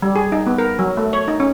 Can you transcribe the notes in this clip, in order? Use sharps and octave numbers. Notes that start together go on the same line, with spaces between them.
G3
G#4
D#4
B3
A#4
F#3
A3
C#5
D#4
C#4